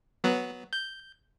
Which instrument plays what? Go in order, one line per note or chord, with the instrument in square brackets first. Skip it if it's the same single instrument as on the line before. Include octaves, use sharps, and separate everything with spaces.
[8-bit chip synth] F#3 B3
G6